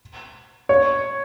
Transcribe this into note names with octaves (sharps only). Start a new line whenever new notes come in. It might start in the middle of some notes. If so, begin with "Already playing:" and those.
C#5